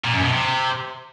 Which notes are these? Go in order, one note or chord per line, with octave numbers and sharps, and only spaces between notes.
A#2
F#2
B2
C3